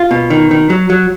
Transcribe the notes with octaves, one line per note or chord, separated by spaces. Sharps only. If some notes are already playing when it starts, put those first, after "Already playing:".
Already playing: F4
B2
D#3
D#3
F#3
F#3